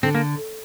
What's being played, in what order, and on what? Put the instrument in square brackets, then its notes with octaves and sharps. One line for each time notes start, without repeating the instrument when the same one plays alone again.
[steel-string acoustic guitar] D3 [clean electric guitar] C4
[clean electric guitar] A#3